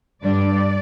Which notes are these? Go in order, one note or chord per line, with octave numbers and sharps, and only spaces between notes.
G2 D3 G3 D4 D5